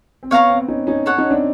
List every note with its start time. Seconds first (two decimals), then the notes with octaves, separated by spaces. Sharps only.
0.23 C4
0.31 B3 C#5 F5 A#5 C#6
0.50 C4
0.68 C#4 D#4
0.87 C#4 D#4
1.06 A4 C#5 F#5
1.18 C#4 D#4
1.31 C4 D4